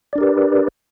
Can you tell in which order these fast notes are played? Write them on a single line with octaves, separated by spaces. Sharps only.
D5 D4 A#4 G4 B4